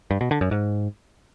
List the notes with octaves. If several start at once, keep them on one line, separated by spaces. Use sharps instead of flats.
G2
B2
D3
F#2
G#2